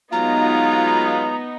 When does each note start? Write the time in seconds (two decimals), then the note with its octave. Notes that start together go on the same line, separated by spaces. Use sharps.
0.12 F#3 G#3 B3 D#4 F4 A#5